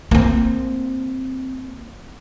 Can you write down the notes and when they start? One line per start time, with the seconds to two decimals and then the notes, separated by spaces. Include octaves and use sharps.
0.11 A#3 C4